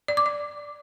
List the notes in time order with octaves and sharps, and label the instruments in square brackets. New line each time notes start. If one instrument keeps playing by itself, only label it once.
[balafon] D5
D6
D5